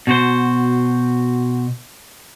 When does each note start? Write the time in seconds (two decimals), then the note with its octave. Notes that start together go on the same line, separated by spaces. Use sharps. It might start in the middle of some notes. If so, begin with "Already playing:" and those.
0.07 B2 F#4 C5